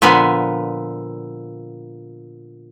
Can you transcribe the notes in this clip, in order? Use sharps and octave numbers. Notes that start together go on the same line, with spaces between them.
A#2 D3 F3 B3 G#5